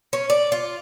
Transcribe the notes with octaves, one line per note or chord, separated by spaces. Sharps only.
C#4
D5
F4